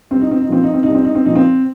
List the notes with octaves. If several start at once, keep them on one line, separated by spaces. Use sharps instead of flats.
C2 C4
D#4
C4
D#4
A#2 F3 C4
D#4
C4
C2 D#4
C4
D#4
C4
A#2 F3 D#4
C4